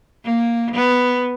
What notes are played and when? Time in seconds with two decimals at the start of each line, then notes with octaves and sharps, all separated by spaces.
0.25 A#3
0.74 B3